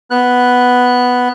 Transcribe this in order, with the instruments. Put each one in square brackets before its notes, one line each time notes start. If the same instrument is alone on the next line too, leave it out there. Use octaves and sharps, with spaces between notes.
[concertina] B3 F#6